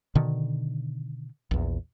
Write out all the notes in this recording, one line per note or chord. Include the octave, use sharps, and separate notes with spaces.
B2 D3 D#3
A#1 E2